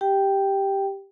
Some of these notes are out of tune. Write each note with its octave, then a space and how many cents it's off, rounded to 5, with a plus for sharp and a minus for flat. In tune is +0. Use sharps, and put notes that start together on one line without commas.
G4 +0 G5 +0